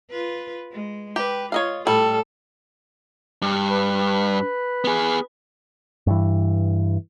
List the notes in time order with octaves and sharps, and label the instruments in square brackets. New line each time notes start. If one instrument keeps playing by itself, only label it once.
[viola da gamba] F4 B4
G#3
[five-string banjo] G4 [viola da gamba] B4
[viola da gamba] F4 [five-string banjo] C#5 D#5 F5
[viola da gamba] A2 [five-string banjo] G3 [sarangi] A4
[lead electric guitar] G2
[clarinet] B4
[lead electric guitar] B3 G#4
[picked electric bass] G2 E3